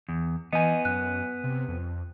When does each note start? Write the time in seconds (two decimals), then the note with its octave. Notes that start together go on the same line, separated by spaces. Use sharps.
0.09 E2
0.53 E3 B3 D#5 G#5
0.85 F#2 F#6
1.44 C3
1.69 F2